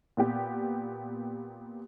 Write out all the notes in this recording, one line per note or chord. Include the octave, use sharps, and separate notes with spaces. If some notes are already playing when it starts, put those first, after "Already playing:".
A#2 B3 G4